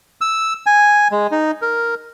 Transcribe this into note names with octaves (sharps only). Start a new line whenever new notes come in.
E6
G#5
G#3
D#4
A#4